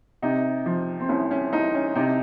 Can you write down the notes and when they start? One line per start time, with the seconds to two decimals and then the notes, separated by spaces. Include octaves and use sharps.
0.22 C3 D#4
0.66 F3
1.00 C4
1.09 C2 C#4
1.31 C#4
1.53 C2 D#4
1.74 C#4
1.95 C3 D#4